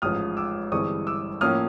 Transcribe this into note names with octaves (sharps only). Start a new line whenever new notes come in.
A1 G#2 F3 D#6 F6
D6 E6
G1 G2 E3 G#3 C4 C#6 D#6
D6 E6
A2 F3 A#3 C#4 D#6 F6